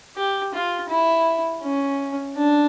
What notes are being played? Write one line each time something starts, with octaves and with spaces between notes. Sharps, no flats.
G4
F4
E4
C#4
D4